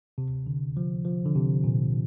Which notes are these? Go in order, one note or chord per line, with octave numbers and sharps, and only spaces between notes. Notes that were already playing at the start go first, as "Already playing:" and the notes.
C3
D3
F3
F3
D3
C3
A#2